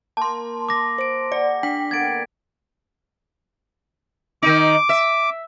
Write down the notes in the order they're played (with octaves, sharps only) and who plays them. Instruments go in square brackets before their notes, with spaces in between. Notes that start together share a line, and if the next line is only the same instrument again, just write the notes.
[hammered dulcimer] A#3 [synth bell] A5 C6
[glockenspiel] D6 A#6
[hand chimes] C5 D7
[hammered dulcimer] F#4 G#4 [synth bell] D5
[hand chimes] D4 [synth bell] G5 [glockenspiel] B6
[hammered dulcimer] D3 A#3 B3 [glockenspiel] G#6 A6 D7
[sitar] D#3 D#4 [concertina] D6
[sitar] E5